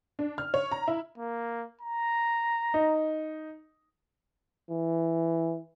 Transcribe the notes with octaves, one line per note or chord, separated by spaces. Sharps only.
D4
F6
C#5
A#5
E4
A#3
A#5
D#4
E3